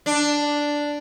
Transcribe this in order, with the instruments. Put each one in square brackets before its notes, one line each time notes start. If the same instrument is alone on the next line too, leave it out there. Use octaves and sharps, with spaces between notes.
[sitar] D4